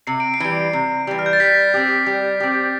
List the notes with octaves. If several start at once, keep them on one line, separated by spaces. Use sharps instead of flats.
C3 C7
D7
C7
E3 G3
C3
E3 G3
F6
G6
A6
G3 B6
C4 G4
G3
C4 G4